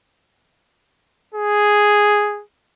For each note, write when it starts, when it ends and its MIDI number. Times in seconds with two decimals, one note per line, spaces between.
1.35 2.42 68